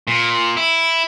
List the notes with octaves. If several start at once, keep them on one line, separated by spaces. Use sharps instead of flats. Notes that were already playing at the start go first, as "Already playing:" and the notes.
A#2
E4